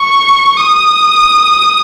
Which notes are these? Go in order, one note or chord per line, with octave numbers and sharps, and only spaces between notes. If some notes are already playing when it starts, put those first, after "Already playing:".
Already playing: C#6
D#6